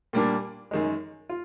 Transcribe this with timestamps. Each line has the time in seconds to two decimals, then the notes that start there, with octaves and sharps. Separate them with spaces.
0.13 A#2 G3 A#3 D4
0.71 F#2 D#3 G#3
1.29 F4